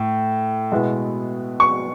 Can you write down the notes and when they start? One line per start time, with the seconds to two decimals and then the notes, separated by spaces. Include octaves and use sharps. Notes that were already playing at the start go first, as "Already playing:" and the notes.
Already playing: A2
0.72 B2 G#3 B3 E4
1.60 C#6